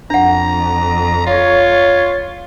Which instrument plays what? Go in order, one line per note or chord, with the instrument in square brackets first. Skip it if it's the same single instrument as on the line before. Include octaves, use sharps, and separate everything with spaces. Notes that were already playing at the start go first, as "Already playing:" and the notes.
[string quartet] F2 [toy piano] D4 F#5 [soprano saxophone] A#5
[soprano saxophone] F4 [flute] C#5